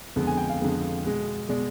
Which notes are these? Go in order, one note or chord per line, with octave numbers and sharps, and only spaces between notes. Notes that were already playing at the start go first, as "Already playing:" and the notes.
F2 D3 G#3 B3
G#5
G5
F5
F2 D3 G#3 B3
B2 G#3 B3
B2 G#3 B3 D5